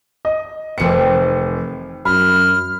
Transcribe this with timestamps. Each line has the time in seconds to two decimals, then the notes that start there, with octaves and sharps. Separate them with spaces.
0.25 D#5
0.78 F1 D#3 E3 C4 C#7
2.05 F#2 B5 F6